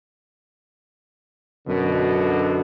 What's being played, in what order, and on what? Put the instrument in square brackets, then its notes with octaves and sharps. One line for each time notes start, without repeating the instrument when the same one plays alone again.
[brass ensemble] F#2 B2 D3